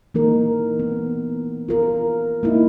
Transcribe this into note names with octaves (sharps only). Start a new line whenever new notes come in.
E3 A#3 D#4 A#4
B3
F4 A#4
A#3 D#4 E4